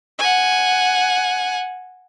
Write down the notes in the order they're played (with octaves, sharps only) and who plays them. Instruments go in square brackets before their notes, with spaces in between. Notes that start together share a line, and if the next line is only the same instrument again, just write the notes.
[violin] F#5 G#5